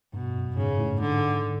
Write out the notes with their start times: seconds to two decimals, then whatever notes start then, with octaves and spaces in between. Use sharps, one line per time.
0.14 G2 B2
0.36 F#2
0.57 G#2 C#3
0.79 A2
1.00 G#2 D3
1.43 D3